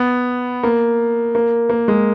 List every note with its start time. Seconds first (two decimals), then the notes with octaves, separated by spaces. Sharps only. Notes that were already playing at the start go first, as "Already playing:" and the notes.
Already playing: B3
0.63 A#3
1.35 A#3
1.70 A#3
1.88 G#3